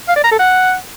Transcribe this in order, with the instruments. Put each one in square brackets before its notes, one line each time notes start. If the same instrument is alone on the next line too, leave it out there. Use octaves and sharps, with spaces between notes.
[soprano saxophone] F5
D5
A#5
A4
F#5